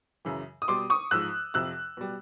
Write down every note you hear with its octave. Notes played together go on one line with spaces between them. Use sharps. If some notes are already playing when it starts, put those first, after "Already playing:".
F#2 C#3 E3
D#6
B2 G3 C6 D6
C#6 D#6
G#2 F3 E6 F#6
F2 C3 F3 E6 F#6
B2 G3